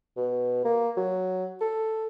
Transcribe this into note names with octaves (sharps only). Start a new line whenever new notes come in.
B2
A#3
F#3
A4